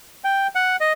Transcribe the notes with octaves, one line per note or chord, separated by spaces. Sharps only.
G5
F#5
D#5